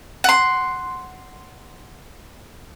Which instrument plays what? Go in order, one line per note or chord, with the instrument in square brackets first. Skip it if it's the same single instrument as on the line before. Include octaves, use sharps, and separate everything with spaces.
[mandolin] F#5 C6